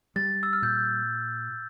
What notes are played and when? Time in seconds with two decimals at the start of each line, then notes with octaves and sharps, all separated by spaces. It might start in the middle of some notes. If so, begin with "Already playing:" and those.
0.16 G3 A6
0.43 E6
0.53 F6
0.62 A#2 G6